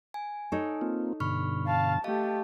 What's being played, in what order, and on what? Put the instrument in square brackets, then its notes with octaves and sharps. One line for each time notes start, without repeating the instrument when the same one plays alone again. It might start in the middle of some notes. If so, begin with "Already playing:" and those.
[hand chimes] G#5
[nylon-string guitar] D#4 A4 C#5
[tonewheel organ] A#3 C4 F4
[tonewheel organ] G2 B2 D3 [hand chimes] B5 C#6 F6
[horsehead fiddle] F5 A5
[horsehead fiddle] A3 G4 [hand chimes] D#5 F5 A5